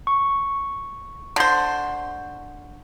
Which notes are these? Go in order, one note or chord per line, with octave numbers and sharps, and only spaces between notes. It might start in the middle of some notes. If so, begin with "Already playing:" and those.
C#6
D3 C5